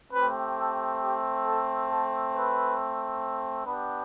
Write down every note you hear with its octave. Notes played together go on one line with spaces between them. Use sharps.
A3 C4 G4 B4
A4
G4
A4
A4
B4
B3 D4 G4 B4